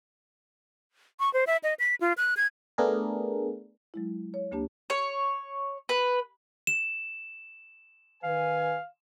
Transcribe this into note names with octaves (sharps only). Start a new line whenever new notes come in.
C#6
C5
E5
D#5
B6
F4
F#6
G#6
A3 B3 D4 G#4 A#4
F#3 G#3 E4
C#5
D2 A#3 D4 G4 A5
C#5
B4
E7
D#3 B4 F5 G#5